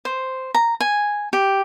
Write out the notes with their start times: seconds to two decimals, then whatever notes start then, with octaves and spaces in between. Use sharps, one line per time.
0.05 C5
0.55 A#5
0.81 G#5
1.33 G4